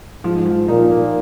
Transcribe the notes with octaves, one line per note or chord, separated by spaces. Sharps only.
G#2 F3
F3
A#2 D#4
A#3